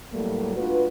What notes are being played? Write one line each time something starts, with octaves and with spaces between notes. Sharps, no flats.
A2 F#3 G3 A3 A#3
D4 F4 F#4 B4